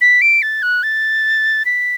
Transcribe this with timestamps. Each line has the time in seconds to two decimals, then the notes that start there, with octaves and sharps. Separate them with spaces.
0.01 B6
0.21 D7
0.42 A6
0.62 F#6
0.83 A6
1.65 B6